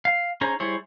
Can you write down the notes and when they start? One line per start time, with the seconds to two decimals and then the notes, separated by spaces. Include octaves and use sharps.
0.05 F5
0.41 C#4 D#4 G#4 C5 A#5
0.60 G3 E4 G#4 C5 C#5